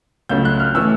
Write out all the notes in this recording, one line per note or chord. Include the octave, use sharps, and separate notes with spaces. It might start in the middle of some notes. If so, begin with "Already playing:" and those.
C#2 C#3 F#3 A3 G6
F#6
F6
A2 E3 A3 E6